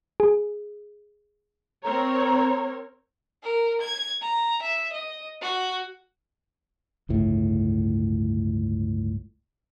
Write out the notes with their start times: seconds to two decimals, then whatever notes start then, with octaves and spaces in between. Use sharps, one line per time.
0.20 G#4
1.83 C4 A#4 C#5 A#5
3.43 A#4
3.80 G#6
4.22 A#5
4.62 E5
4.92 D#5
5.41 F#4
7.09 G1 C#2 A2